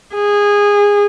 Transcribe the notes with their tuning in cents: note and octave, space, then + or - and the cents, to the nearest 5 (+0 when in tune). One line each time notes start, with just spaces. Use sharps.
G#4 -20